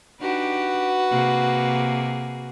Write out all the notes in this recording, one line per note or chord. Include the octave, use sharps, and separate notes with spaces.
D4 D#4 F#4 G4 B4
C3 A#3 G#4